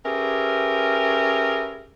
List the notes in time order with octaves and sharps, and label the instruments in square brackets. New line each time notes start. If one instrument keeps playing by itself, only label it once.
[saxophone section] C#4 G4 G#4 A#4 B4 E5